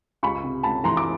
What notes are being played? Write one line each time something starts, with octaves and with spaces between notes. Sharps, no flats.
C#2 B5 C#6
C3
C#2 A5 B5
E3 A#5 C6
D6